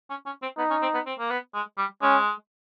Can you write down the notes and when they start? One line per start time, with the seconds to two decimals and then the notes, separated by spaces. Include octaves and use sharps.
0.10 C#4
0.26 C#4
0.42 C4
0.58 B3 D#4
0.70 C#4
0.82 C4
0.94 B3
1.06 C4
1.19 A#3
1.30 B3
1.54 G#3
1.78 G3
2.02 G#3 C#4